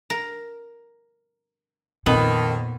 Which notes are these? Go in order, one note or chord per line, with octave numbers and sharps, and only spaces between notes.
A#4
F2 A#2 D#3 B3